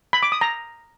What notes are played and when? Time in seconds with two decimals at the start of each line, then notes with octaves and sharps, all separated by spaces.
0.13 B5
0.23 D6
0.32 D#6
0.41 A#5